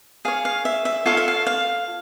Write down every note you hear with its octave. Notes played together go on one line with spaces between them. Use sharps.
G#4 C#5 F5
F5
E5
E5
F4 A4 C#5 F5
E5
F5
F5